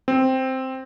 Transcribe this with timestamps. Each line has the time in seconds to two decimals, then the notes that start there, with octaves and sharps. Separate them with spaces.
0.08 C4